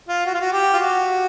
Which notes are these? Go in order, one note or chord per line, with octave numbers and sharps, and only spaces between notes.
F4
F#4
F4
F#4
G4
F4
F#4